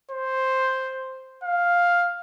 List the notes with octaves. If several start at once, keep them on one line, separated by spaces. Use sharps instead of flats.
C5
F5